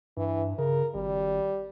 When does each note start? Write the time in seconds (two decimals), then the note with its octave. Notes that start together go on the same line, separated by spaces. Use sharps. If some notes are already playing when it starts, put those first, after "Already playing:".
0.17 G2 E3
0.58 C#3 A#4
0.94 G#1 G3